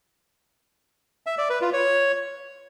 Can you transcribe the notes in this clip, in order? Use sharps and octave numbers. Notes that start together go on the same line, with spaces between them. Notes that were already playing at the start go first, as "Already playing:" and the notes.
E5
D5
B4
F4
C#5